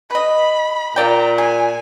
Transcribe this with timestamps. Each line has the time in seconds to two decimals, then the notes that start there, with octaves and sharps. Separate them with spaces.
0.11 B4 D#5 B5
0.96 A#2 F4 D5 G5 A#5
1.38 G#4 G#5